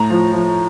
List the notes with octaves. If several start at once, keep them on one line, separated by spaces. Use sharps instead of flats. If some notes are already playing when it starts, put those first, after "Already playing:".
Already playing: A2 A#5
F3
F3